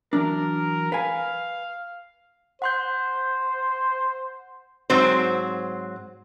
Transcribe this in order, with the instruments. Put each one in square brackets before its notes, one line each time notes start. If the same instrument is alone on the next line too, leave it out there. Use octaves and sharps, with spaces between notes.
[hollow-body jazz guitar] E3 F#3 D4 [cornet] A#4
[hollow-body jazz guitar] B4 G#5 [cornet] F5
[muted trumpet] C5 [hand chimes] F#5 C6 G6
[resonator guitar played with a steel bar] G#2 F#3 C4 C5